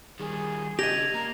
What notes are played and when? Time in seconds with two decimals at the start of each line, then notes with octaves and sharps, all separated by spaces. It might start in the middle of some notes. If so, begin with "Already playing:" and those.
0.20 D#3 G3 G#4
0.79 C#3 D4 G4 D#5 G#6 A#6 F7
1.14 A#3 A#5